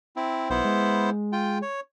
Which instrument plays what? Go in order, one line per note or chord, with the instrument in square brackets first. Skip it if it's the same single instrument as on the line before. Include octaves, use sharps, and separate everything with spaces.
[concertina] C4 E4
[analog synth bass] B1 [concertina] B3 E4 C5
[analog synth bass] G#3
[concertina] F4 G5
C#5